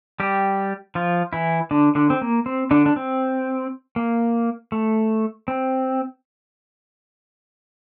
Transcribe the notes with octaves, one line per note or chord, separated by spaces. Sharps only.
G3 G4
F3 F4
E3 E4
D3 D4
D3 D4
C4
A#3
C4
D3 D4
D4
C4
A#3
A3
C4